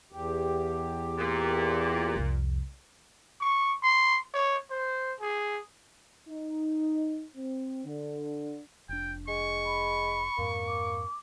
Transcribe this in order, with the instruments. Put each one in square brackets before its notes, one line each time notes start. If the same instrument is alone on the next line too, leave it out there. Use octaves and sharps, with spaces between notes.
[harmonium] E2 G4
[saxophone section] A#2
[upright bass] C2 F2
[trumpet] C#6
C6
C#5
C5
G#4
[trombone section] D#4
C4
D3
[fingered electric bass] F1 D4 [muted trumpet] G5
[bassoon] G#3 [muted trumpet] C#6
[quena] B5
[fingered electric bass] F2 G#2 [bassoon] A#3
[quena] D6